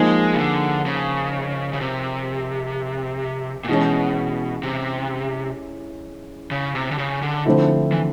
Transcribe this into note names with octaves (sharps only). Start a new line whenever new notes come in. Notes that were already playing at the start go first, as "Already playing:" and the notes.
Already playing: F3 G#3 A#3 D#4 G#4
C#3
D3
C#3
C#3
C3
A#2
B2 E3 G#3 C#4
C3
C#3
C3
D3
C#3
D3
D3 F3 A3 C4 E4
E3